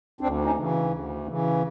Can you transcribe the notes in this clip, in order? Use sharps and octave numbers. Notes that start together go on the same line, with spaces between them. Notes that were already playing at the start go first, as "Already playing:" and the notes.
D2 C4 D4
C#4 D#4
C#3 E3
D2
C#3 E3